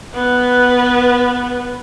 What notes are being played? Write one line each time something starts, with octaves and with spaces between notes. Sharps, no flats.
B3 B4